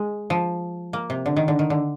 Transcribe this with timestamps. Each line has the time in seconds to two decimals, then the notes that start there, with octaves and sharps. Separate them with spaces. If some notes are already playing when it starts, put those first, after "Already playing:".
Already playing: G#3
0.30 F3
0.93 A#3
1.10 C3
1.26 D3
1.37 D#3
1.48 D3
1.59 D#3
1.70 D3